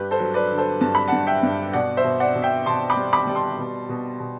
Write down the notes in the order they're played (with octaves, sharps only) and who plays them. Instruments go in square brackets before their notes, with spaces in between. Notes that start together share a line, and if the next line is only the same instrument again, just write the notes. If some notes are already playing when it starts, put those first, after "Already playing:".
Already playing: [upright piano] G2 G4 B4
A4 C5
F#3
B4 D5
D3
A4 C5
G2 A5
B5
G2 F#5 A5
E5 G5
G2
B2 D5 F#5
C5 E5
B2
D5 F#5
B2
E5 G5
B2 A5 C6
B5 D6
G3
B5 D6
G3
A5 C6
B2
B2
B2